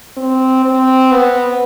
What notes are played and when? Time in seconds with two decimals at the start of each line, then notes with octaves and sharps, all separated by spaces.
0.17 C4
0.65 C4
1.12 B3